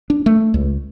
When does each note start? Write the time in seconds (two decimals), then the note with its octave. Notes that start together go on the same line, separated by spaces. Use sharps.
0.10 D4
0.26 A3
0.54 C#2